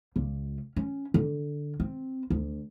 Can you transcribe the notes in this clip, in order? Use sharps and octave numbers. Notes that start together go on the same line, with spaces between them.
C#2
C#4
D3
C4
D2